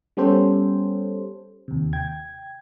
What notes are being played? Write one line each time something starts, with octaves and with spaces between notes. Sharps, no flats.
G3 B3 C#4 G4 A4 C5
D#2 C3
G5 G#6